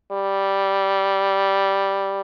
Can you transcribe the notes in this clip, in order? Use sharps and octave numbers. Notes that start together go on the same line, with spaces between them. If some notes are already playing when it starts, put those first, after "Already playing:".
G3